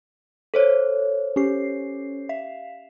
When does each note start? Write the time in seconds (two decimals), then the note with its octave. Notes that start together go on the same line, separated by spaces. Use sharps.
0.54 A4 C5 C#5
1.36 C#4 G4 C7
2.29 E5 F5